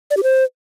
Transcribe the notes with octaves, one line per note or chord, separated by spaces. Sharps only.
D5
G4
C5